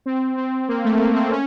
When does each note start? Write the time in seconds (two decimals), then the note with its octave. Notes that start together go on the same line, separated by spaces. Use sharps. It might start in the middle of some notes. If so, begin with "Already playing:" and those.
0.06 C4
0.38 C4
0.68 A#3
0.85 A3
1.01 A#3
1.15 C4
1.31 C#4